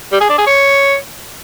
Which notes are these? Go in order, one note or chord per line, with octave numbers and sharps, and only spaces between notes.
G3
G#4
D4
G#4
C#5